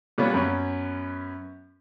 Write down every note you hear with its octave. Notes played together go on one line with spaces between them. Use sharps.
A#2 D3 G3 B3 F4 C#5
F#2 B3 C#4